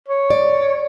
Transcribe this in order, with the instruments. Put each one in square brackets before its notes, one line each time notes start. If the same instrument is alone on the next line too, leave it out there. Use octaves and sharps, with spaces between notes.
[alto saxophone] C#5
[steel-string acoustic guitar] D5